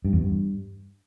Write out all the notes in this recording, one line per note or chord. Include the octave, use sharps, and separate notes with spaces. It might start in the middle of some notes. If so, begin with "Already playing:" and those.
G2
E2
G2